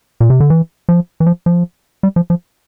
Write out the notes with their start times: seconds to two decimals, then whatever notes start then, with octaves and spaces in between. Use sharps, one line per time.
0.20 A#2
0.30 C3
0.40 D3
0.50 E3
0.89 F3
1.20 E3
1.27 F3
1.46 F3
2.03 G3
2.16 F3
2.30 F3